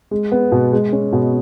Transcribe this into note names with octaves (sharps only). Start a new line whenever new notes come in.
G#3
B3
B2
G#3
C#4
B2